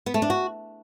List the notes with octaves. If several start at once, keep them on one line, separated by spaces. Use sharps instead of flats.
B3
A3
D4
F#4